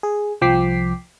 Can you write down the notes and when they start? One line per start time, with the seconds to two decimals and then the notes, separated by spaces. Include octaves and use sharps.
0.03 G#4
0.41 C2 F3 G5 D6 B6 C7